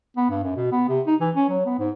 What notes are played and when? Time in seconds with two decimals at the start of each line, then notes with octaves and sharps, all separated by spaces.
0.17 B3
0.30 G2
0.43 F#2
0.57 B2
0.72 B3
0.89 C3
1.07 D#4
1.21 E3
1.35 C#4
1.49 F#3
1.66 B3
1.79 G#2